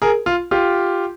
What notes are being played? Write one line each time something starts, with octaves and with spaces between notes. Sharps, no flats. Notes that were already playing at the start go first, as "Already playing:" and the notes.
G#4 A#4
F4
F4 G4